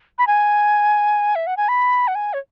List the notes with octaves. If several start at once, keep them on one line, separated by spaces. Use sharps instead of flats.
B5
G#5
E5
F#5
G#5
B5
F#5
G#5
C#5